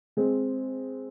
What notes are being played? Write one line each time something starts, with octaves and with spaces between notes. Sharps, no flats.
G#3 C4